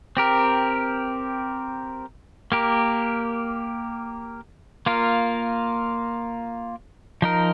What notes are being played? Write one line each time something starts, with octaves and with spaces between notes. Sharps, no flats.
C4 G4 A#4
A#3 G4 A#4
A#3 F4 A#4
F3 D#4 A#4